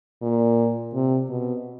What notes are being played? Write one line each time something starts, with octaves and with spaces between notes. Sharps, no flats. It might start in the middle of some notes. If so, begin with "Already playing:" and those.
A#2
C3
B2